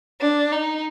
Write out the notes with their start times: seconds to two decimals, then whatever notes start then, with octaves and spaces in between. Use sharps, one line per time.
0.21 D4
0.52 D#4